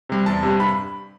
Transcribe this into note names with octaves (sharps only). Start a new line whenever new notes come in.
C3 G3
E2 A5
C3 G3
G2 B5